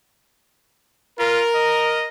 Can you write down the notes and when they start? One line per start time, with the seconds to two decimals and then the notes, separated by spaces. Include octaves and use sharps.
1.19 F4 A#4
1.56 D#5